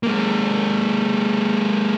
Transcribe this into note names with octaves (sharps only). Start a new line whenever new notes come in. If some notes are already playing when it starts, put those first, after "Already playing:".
G#3 A#3